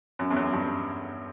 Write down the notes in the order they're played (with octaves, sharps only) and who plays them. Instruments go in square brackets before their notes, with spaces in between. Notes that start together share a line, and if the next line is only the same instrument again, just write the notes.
[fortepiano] F#2
E2
F#2
G2